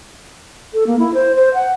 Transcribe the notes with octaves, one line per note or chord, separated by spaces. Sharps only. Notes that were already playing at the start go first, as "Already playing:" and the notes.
A4
A#3
E4
C5
C5
F#5